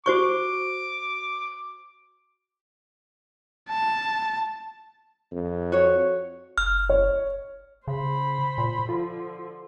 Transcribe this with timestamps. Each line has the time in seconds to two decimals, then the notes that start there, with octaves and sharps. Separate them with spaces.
0.06 F#4 C5 C#6 D6
3.69 A5
5.32 F2
5.72 F#4 C#5
6.58 F#1 F6
6.89 C#5
7.88 C#3 C5 B5
8.58 A#2
8.89 D3 F3 F4